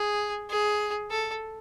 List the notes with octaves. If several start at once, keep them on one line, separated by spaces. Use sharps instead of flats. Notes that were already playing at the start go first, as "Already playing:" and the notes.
Already playing: G#4
G#4
A4